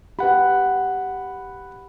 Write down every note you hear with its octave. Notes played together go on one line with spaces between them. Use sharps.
G4 B4 F#5 B5